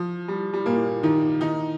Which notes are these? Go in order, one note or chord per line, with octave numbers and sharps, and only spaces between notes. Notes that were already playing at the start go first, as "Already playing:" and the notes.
Already playing: F3
G3
G3
A#2 A#3
D#3 D#4
D#3 D#4